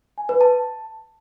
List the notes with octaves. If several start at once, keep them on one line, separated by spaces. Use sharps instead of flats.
G#5
B4
A5